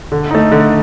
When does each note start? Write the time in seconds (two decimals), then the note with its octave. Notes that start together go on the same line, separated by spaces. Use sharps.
0.12 D3
0.31 A3 D#4
0.52 D3